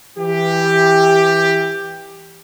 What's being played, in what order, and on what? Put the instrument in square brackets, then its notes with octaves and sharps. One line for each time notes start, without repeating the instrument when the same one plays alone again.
[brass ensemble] E3 G4